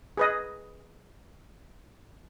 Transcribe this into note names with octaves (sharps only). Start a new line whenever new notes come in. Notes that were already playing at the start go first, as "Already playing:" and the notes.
G#4 B4 D#5